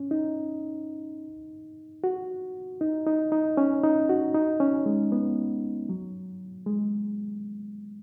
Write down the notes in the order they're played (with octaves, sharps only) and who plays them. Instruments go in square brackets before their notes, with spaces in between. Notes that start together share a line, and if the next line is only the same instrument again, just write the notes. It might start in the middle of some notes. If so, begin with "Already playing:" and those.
Already playing: [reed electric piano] C#4
D#4
F#4
D#4
D#4
D#4
C#4
D#4
F#4
D#4
C#4
G#3
B3
F#3
G#3